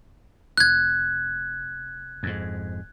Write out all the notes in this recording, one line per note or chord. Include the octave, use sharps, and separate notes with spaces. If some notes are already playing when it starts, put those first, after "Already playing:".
F1 F#6 G#6
F2 G#2